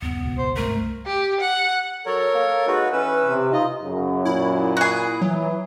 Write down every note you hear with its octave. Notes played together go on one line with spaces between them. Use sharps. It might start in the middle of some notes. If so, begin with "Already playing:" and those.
G1 D#2 C#3 B3
C#2 B2
C5
C2 G2 G#3 A3 A#4
G4
F#5
F#3 A4 A#4 C#5
A#3
G#3 D#4 F#4 B4
E3 C#4 B4 E6
C3
D#4 F4 D#5
F#2 C#3
A#2 E4
F#4 G#4
E3 F#3